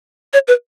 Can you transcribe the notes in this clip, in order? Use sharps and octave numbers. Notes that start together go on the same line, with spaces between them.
C#5
B4